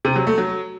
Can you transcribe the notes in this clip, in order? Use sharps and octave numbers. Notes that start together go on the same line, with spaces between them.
C3
F#3
A3
F#3